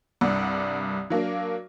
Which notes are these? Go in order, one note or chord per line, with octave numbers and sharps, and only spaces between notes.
C2 G2 D5 F#5
F#3 A#3 D4